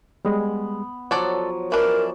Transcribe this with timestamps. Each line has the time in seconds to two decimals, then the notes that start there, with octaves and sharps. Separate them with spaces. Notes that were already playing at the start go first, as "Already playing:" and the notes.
0.25 G3 G#3 B3
1.11 F3 F#3 A4 C#5 D5 F#5
1.72 E3 D4 A#4